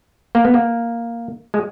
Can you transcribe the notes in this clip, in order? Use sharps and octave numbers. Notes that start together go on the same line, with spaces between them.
A#3
B3
A#3
G#3